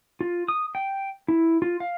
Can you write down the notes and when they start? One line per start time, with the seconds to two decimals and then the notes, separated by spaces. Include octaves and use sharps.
0.21 F4
0.48 D#6
0.75 G5
1.28 E4
1.62 F4
1.80 F5